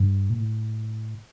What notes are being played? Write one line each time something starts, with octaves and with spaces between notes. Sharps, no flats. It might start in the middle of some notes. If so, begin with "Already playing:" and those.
Already playing: G2
A#2
A2